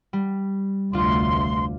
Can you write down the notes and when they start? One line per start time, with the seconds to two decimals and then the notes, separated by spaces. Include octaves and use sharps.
0.13 G3
0.93 F1 D2 D4 F4 C6